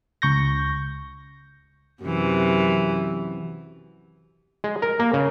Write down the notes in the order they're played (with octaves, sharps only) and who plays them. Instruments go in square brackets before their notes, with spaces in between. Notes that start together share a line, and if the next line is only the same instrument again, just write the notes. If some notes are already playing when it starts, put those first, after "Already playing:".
[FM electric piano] C#2 C#6 G6 A#6
[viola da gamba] F#2 C3 E3
[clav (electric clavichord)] G#3
A#4
A#3
C#3